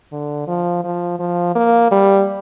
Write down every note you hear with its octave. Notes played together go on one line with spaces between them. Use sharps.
D3
F3
F3
F3
A#3
G3